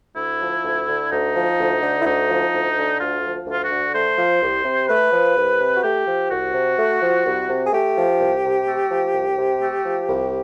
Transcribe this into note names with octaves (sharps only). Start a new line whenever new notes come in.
D2 E4
F3
D2
D3
D2 D#4
F3
D2
D3
E4
D2 D#4
F3
D2
D3
D2 F4
F3
D2 F4
F#4
D3
A3 C5
F3
C2
C3
A3 B4
F3
C2
C3
F#4
A3 G4
F3
C2 F#4
C3
A3
F3
C2
C3
G#4
A3 G4
F3
C2
C3
A3
F3
C2
C3
A3
F3
C2